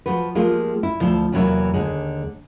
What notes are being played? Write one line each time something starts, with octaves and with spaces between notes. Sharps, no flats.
F3 F#4 B4
F3 G#3 A#3 F4 G4
E4
D2 F3 E4 D5 A5
E2 C3 E3 F#3 A#3 E4
D#2 D3 G#3